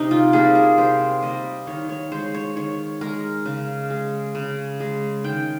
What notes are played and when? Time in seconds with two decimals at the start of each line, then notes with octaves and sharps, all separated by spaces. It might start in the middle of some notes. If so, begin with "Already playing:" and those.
Already playing: C3 D#4
0.11 F4
0.33 G3 A#3 G#4
0.55 A#4
0.78 C3 C5
1.23 G3 A#3 D#5
1.67 D#3 C#5
1.89 C#5
2.12 G#3 C5
2.34 C#5
2.56 D#3 C#5
3.01 G#3 A#4
3.46 C#3
3.90 G#3
4.35 C#3
4.80 G#3
5.24 D#3 G5